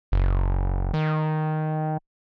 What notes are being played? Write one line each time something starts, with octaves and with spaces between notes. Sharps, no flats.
F#1
D#3